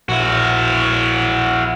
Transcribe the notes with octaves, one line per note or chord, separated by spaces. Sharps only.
A#1 E4 F#4